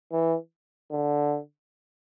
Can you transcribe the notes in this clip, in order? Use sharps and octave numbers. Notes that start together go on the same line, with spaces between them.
E3
D3